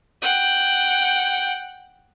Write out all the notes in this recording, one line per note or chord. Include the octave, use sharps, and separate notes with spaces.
F#5 G5